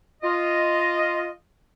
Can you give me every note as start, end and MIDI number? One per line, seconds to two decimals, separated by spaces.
0.23 1.29 65
0.23 1.29 75